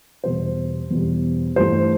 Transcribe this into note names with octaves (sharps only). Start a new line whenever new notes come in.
E2 B2 G3 C5
E2 B2 G3
G2 E3 A3 C5